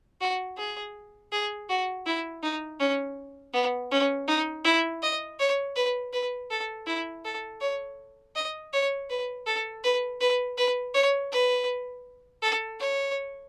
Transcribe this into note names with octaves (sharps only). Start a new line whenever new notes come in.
F#4
G#4
G#4
F#4
E4
D#4
C#4
B3
C#4
D#4
E4
D#5
C#5
B4
B4
A4
E4
A4
C#5
D#5
C#5
B4
A4
B4
B4
B4
C#5
B4
A4
C#5